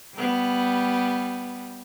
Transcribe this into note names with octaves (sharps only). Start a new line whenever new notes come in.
G3 B3